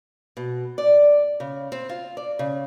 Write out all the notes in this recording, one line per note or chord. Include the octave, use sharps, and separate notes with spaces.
B2
D5
C#3
C4
F4
D5
C#3